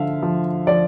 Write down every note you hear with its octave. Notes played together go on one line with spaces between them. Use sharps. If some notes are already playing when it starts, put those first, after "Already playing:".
Already playing: D3 F3 E5 F5
F3
F3 D5